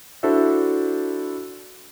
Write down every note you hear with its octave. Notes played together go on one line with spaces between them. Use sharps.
D4 E4 F#4 A4 C5 E5